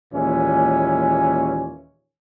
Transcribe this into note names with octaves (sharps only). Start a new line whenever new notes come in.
D#2 A#2 E3 G#3 C#4